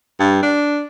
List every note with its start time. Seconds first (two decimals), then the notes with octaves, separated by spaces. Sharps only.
0.20 G2
0.43 D4